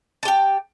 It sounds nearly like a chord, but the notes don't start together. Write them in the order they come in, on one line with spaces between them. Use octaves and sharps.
A5 G4 G5